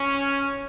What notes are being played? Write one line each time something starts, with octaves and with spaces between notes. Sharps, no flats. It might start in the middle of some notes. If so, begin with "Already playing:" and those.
Already playing: C#4